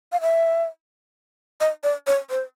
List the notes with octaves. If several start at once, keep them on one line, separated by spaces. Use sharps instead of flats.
F5
E5
D#5
D5
C#5
C5